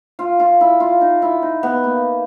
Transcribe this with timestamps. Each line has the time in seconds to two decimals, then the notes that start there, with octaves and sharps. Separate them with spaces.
0.19 F4
0.40 F4
0.61 E4
0.80 F4
1.01 D#4
1.22 E4
1.42 D#4
1.63 B3
1.84 A#3